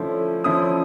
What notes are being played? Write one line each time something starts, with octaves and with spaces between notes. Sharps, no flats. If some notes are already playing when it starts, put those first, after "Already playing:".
Already playing: D3 F3 A3 C#4 E4
D3 F3 A3 C#4 E4 D#6